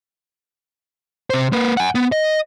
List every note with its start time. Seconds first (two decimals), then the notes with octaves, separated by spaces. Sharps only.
1.30 C3 C5
1.52 A#3 B4
1.77 F#5 G#5
1.95 B3
2.12 D#5